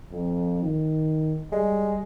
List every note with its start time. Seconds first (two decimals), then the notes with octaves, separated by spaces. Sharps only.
0.12 F2
0.62 D#3
1.52 G3 G#3